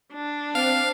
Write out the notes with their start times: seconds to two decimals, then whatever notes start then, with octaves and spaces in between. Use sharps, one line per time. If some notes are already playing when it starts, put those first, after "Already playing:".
0.13 D4
0.55 C4 F5